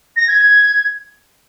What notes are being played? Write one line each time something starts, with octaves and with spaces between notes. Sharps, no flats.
A#6
G#6